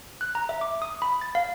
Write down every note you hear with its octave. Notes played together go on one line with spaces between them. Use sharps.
F#6
A#5
E5
D6
D#6
B5
A6
F5